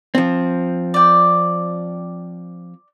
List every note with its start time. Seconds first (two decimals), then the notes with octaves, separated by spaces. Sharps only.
0.15 F3 C4
0.94 D5 G5